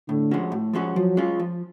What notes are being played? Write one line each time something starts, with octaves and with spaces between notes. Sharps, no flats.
A2 D3
F3 G#3 C#4 F#4
A2
F3 G#3 C#4 F#4
F3 F#3
G#3 C#4 F4
F3